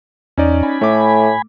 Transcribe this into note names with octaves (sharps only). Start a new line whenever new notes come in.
E2 C#4 D#4 D5
G#5 B5
A2 A3 D6